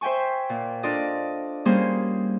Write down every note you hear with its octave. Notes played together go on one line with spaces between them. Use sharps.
C5 E5 G5 G#5 C#6
A#2
D4 F4 A4 D5 D#5
G3 A#3 C#4 G#4 C5